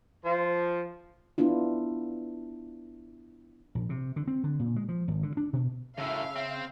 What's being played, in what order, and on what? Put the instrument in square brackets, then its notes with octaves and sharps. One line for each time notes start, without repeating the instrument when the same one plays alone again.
[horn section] F3
[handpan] B3 D4 E4 F4
[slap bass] A#1
C3
D3
C4
D3
A#2
G#3
F3
G#1
D3
D4
B2
[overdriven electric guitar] F#2 A2 [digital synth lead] C#3 [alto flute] E5 [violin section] F5
[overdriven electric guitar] C4